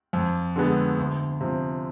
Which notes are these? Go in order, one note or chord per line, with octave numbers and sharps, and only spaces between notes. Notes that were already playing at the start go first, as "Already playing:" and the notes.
F2
D3 G#3 B3
D2
C3 F3